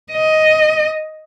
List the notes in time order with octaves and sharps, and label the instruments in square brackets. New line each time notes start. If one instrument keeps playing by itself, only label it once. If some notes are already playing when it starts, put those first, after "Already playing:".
[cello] D#5